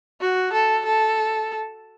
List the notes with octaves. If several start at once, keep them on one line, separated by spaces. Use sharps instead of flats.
F#4
A4
A4